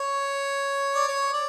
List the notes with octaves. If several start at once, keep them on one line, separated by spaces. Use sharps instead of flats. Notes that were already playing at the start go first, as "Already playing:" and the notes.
Already playing: C#5
D5
C#5
D5